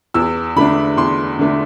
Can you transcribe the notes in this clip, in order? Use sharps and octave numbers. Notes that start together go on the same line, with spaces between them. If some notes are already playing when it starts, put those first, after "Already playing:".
E2 E6
D3 A3 D4 B5
E2 C6
D3 A3 D4